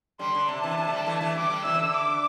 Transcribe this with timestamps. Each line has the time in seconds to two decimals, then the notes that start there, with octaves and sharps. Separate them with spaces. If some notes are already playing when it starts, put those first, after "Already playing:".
0.19 D3 G3 C6
0.35 D3
0.48 C3 A5
0.63 C3 E3
0.78 C3 E3
0.88 A3
0.92 D3 G3
1.06 E3 A3
1.20 E3 A3
1.35 D3 G3 D6
1.50 D3 G3
1.65 C3 E3 E6
1.75 C3
1.79 D3
1.94 D6